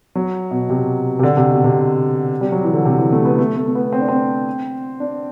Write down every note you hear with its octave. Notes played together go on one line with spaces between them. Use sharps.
F#3
B2
C3
C3
D3
C3
B2
C3
G3
F#3
E3
D3
C3
E3
A3
B3
A3
A3
A3
B3
C4
D4
C4
D4